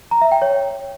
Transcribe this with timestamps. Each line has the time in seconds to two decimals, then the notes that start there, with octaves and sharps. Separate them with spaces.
0.11 A#5
0.21 E5
0.32 G5
0.42 C#5